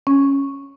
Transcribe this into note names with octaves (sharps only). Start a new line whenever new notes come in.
C#4